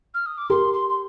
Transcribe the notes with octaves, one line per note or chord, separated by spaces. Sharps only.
F6
D#6
D6
G4 A#4 C6
C6
C6